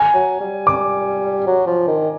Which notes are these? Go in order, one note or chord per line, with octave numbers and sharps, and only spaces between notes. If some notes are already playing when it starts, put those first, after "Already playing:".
Already playing: G#5
F#3
G3
D6
F#3
F3
D#3